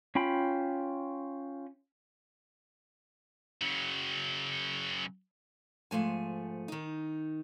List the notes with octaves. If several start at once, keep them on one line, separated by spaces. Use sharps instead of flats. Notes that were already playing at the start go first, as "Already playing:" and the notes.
C#4 F4 G5 B5
C#3 F#3
G#2 F3 A3 G#5
D#3 D#4